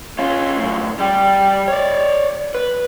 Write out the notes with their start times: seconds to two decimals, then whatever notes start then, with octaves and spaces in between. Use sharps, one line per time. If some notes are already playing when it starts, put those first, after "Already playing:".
0.19 C#4 F4
0.58 F#2 A2
1.00 G3 G4
1.68 C#5 D5
2.55 B4